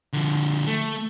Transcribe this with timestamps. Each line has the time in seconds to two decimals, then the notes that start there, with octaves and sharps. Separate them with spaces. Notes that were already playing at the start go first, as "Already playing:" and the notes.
0.13 D3 F3
0.67 A3